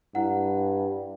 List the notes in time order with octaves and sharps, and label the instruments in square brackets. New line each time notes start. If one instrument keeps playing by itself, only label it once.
[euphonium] G2 [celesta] E4 F#5